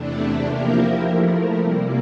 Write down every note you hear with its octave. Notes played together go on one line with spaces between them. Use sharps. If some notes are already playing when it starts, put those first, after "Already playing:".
Already playing: E2 C3 E3 A3 D4
F3 A#3 E4 G4 A#4
F3 A3 E4 A#4
C3 G3 A#3